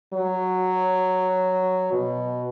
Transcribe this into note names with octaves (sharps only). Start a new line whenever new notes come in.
F#3
B2